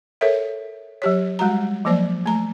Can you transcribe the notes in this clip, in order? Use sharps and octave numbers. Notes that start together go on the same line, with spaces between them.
A4 A#4 C#5 E5
F#3 G4 C#5
G3 G#3 F#4 A#5
F3 F#3 A#3 C5 D5
A3 A#5